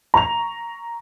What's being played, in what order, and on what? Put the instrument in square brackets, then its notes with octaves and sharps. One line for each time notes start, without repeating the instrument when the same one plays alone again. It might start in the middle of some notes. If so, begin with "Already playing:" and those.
[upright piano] A#5 C#6 F7